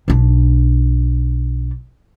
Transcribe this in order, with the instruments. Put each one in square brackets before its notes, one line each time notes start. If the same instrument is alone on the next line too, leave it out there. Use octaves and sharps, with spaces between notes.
[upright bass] B1 D4